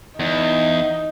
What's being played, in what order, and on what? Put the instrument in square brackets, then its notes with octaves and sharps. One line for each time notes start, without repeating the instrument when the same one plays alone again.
[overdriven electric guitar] E2 [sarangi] D#4